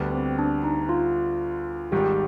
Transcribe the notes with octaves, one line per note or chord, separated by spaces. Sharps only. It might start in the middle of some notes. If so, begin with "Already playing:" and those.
Already playing: D2 D3 G3 B3
C4
D4
D#4
F4
G#1 G#2 D#3 G3 G4